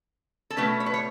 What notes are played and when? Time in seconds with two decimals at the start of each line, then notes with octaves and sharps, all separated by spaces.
0.50 A4
0.57 B2 A3 C#4 B4
0.80 C#5
0.86 B4
0.94 C#5